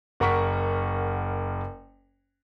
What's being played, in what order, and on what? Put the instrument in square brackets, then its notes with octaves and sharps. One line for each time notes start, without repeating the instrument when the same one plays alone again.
[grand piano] F#1 A#4 F#5 C#6 B6